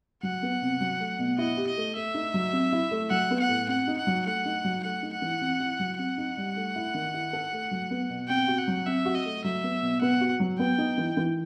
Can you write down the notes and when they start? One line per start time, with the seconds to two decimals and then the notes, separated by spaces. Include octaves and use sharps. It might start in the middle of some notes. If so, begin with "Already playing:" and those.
0.23 F#3 F#5
0.43 B3
0.62 C3
0.81 F#3
1.00 A3
1.19 B2
1.38 E4 D#5
1.57 G4
1.67 D#5
1.77 A3
1.96 A3 E5
2.14 D#4
2.34 F#3
2.53 C4
2.72 E4
2.91 A3
3.10 F#3 F#5
3.31 B3
3.40 F#5
3.49 A2
3.68 C4 F#5
3.87 D#4
3.97 F#5
4.07 F#3
4.26 A3 F#5
4.46 D#4
4.65 F#3
4.83 A3 F#5
5.03 D#4
5.13 F#5
5.22 E3
5.41 C4
5.60 E4
5.80 F#3
5.98 C4 F#5
6.18 D#4
6.37 G3
6.56 A3
6.76 E4
6.94 D#3
7.14 E4
7.33 A4
7.53 A3
7.71 F#3
7.91 B3
8.10 B2
8.29 C4 G5
8.48 F#4
8.58 F#5
8.68 F#3
8.87 C4 E5
9.05 F#4
9.15 D#5
9.25 A3
9.44 F#3 E5
9.64 B3
9.82 B2
10.01 B3 F#5
10.21 F#4
10.40 F#3
10.59 B3 G5
10.78 D#4
10.98 E3
11.17 E3